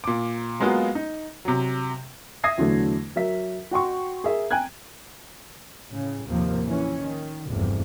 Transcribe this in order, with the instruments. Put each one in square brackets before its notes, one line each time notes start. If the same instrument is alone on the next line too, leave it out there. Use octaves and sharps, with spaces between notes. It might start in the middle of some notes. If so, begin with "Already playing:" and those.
[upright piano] A#2 D6
F#3 G#3 A#3 B3 F4 F#4
D#4
C3 F#3
[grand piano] E5 D#6 G#6 A#6 C7
E2 D3 F#3 A3
F#3 A#4 E5 B6
F#4 G5 C6 C#6
G#4 A#4 E5
G5 G#5 A#5 F#6 G#6
[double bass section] A2 C#3
D#2 A2 C3 F3 A#3
E3 C#4
D#3
F1 E2 G2 C3